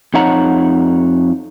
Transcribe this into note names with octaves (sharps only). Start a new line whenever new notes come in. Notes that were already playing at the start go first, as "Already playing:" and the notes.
F2 D#4 C#5 F#5 A#5